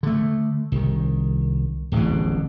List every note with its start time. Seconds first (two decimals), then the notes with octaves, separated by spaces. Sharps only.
0.03 D3 A3
0.72 C2 D#3
1.92 D1 A1 F2 B2